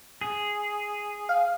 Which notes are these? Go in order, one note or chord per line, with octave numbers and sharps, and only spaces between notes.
G#4
F5